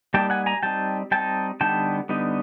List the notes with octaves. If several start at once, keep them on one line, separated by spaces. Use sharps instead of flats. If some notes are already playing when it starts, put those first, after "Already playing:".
G3 A#3 D#4 G5 A5
F#5 G#5
G#5 A#5
G3 C4 D#4 G5 A5
G3 C4 D#4 G5 A5
D3 G3 B3 D#4 G5 A5
D3 G3 B3 D#4